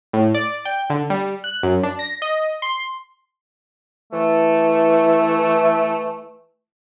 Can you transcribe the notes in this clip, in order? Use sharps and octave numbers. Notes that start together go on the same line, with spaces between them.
A2
D5
G5
D3
G3
F#6
F#2
D4
A#6
D#5
C6
E3 A3